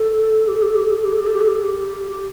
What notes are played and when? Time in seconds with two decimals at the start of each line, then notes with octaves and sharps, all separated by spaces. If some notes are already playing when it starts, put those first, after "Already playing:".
Already playing: A4
0.48 G4
0.55 A4
0.62 G4
0.69 A4
0.76 G4
0.83 A4
0.91 G4
0.98 A4
1.05 G4
1.12 A4
1.19 G4
1.27 A4
1.34 G4
1.41 A4
1.48 G4
1.55 A4
1.62 G4
2.11 G4